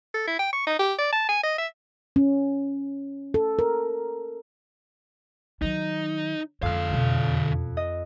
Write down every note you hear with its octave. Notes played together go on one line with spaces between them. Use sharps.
A4
E4
G5
C#6
D#4
G4
D5
A5
G#5
D#5
E5
C#4
A4
A#4
D#3 F#3 D#4
F2 D3 E3 G#3 F5 F6
E2 B2
D#5